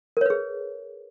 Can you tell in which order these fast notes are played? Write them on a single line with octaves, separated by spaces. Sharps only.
A#4 C#5 B4 G#4